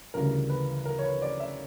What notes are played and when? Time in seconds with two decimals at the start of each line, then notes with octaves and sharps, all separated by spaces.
0.14 D2 C#3 E3 G3 A#4
0.50 B4
0.85 A#4
0.99 C#5
1.04 B4
1.22 D5
1.40 E5